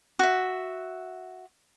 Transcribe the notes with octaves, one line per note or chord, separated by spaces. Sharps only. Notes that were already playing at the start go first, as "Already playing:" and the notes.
F#4 E5